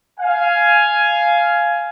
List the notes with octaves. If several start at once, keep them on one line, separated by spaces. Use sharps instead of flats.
F5 G#5